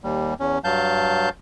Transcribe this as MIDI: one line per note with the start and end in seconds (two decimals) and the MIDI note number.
0.04 0.34 39
0.04 0.34 55
0.40 0.59 40
0.40 0.59 61
0.64 1.29 43
0.64 1.29 54
0.64 1.29 77
0.64 1.29 81
0.64 1.29 91